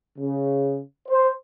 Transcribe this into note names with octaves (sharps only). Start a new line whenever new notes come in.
C#3
C5